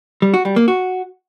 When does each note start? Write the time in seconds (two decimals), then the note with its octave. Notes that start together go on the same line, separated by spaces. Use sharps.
0.22 G3
0.34 F#4
0.45 G3
0.56 A#3
0.68 F#4